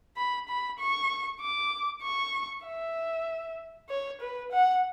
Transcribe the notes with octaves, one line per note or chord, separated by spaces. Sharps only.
B5
B5
C#6
D6
C#6
E5
C#5
B4
F#5